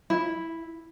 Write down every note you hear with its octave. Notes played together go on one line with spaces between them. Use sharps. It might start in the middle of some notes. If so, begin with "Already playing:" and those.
E4